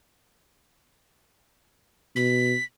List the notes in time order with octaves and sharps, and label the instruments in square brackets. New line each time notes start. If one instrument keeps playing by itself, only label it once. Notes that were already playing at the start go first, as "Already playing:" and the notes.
[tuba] B2 [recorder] B6